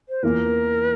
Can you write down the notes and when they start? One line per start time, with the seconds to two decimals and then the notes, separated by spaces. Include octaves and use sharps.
0.09 C5
0.23 E2 E3 A#3 F4 A#4